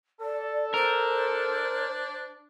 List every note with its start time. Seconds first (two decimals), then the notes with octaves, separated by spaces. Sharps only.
0.21 A4 D5
0.74 D4 A#4 C5